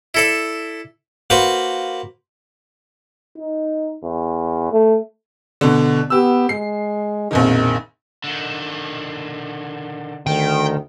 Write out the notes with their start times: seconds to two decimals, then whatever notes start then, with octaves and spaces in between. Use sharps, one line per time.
0.14 E4 A4 D5
1.30 A#3 F#4 B4 C5
3.38 D#4
4.03 E2
4.72 A3
5.61 B2 D3
6.10 B3 G4 E6
6.49 G#3 C7
7.31 A#1 F2 B2 D#3
8.24 D3 D#3
10.27 D2 D#3 G5